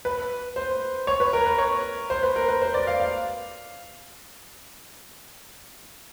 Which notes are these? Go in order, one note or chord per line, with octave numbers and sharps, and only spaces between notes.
B4
C5
C#5
B4
A#4
B4
C#5
C5
B4
A#4
B4
C5
D5
F5
F5